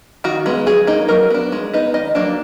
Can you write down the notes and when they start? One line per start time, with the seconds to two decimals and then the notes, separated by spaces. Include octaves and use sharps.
0.24 D#3 F#4
0.46 G#3 B3
0.66 F#3 G#4
0.87 A#3 D#4
1.08 F#3 A#4
1.30 B3 D4
1.52 G#3
1.73 B3 D#4
1.94 D#3 D#5
2.15 F#3 A#3 D4